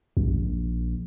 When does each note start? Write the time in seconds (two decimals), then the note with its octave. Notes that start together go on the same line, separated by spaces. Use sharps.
0.17 A#1